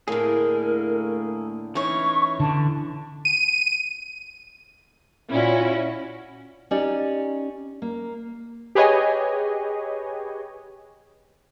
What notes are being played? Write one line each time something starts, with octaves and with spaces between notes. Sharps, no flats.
A2 D3 A3 A#3 G#4 A#4
E3 C#4 D#4 E4 C#5 C#6
D3 A5
D#7
A#2 C#4 E4 F#4
C#4 D#4 G4 D5
A#3
G4 G#4 B4 C#5 D#5 G#5